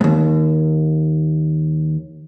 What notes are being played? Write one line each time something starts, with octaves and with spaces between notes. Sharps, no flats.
D#2 G#2